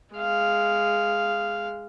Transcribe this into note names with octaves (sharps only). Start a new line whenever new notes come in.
G#3 F5